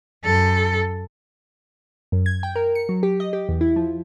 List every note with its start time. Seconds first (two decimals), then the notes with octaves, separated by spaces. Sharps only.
0.24 F#2 A4
2.12 F#2
2.26 G#6
2.43 G5
2.56 A#4
2.75 C#7
2.89 F#3
3.03 G4
3.20 D#5
3.33 G4
3.49 E2
3.61 E4
3.76 F3